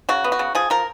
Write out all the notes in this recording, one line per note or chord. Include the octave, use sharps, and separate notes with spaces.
C#3 F#4
B3
F#4
C#3
F3 G#4
F3 A#4